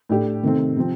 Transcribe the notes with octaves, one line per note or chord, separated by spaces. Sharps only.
A2 A3 D4 G4
C3 D#3 A3 C4
C3 F3 C4